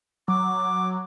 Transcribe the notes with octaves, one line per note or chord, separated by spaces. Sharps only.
F#3 D6